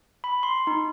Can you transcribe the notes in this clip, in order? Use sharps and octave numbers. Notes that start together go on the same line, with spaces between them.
B5
C6
D#4